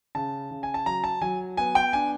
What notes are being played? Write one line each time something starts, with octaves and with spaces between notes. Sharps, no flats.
C#3 A5
C#3
G#5
A5
F#3 A#5
A5
F#3 G#5
B3 G#5
G5
D4 G#5